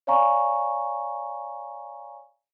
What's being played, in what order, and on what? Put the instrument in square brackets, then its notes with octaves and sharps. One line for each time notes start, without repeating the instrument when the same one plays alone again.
[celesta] C#5 D5 F5 G#5 A#5 C#6